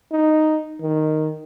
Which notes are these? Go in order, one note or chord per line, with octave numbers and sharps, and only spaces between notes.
D#4
D#3